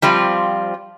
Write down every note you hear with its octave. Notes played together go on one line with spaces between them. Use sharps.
F3 G3 C4 F4